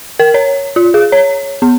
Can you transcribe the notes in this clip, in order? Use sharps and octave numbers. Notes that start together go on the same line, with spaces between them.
A#4
C#5
F4
G#4
C#5
B3